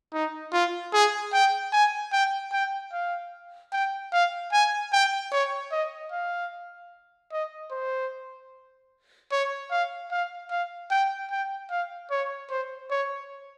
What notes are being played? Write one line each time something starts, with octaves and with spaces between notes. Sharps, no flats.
D#4
F4
G#4
G5
G#5
G5
G5
F5
G5
F5
G#5
G5
C#5
D#5
F5
D#5
C5
C#5
F5
F5
F5
G5
G5
F5
C#5
C5
C#5